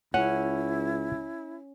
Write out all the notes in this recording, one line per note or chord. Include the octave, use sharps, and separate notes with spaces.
C#2 C#4 E4 F#5